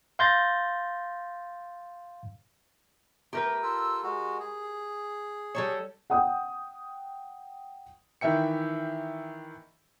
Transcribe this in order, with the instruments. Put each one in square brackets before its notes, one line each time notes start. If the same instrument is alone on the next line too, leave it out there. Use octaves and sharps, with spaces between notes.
[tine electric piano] F5 C6 G6 A6 A#6
[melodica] A3 [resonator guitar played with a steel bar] G4 A#4 B4
[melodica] F4 A4 E6
G#3 F#4
G#4
[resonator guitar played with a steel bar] G3 A4 C#5
[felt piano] F#5 G5 D#6
[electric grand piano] D#3 E3 E5 G5 C#7